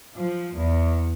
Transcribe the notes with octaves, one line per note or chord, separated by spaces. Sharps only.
F3
E2